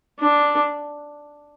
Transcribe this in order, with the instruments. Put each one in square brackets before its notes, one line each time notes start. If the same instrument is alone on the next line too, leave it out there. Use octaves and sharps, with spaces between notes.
[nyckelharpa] D4